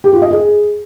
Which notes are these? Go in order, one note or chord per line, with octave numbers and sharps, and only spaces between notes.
G4
F4
D#5
G#4